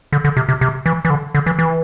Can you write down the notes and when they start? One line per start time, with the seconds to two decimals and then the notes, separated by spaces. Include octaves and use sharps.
0.12 D3
0.25 D3
0.37 C3
0.49 C3
0.61 C3
0.86 E3
1.05 E3
1.10 D3
1.35 D3
1.46 E3
1.59 E3